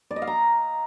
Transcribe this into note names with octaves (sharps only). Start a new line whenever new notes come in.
D5
D#5
F5
A#5